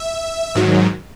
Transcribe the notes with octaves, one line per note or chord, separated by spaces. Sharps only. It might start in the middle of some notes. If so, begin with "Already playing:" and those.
Already playing: E5
G#2 D#3 F#3